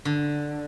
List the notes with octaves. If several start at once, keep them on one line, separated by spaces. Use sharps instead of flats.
D3